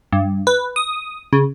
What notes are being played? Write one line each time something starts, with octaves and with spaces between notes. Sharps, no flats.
G2
B4
D#6
C#3